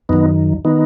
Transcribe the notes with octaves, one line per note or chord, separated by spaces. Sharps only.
F#2 D#3 B3 D#4
D#3 B3 D#4